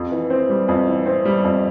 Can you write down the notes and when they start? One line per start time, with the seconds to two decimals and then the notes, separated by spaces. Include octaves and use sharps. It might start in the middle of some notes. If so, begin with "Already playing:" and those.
Already playing: F2
0.11 E3
0.30 C4
0.49 G3
0.68 F2
0.88 E3
1.06 C4
1.25 G3
1.44 F2